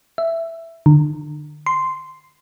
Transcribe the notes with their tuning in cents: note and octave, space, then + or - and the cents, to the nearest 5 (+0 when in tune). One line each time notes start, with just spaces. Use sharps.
E5 +5
D3 +25
C6 -10